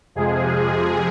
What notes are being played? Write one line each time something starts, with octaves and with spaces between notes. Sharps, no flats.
F2 C3 F3 G#3 G#4